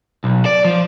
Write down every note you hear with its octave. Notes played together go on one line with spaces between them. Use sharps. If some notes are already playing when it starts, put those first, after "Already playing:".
B1
D5
F3